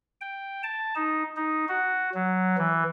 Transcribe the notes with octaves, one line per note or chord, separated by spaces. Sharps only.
G5
A5
D#4
D#4
F#4
F#3
E3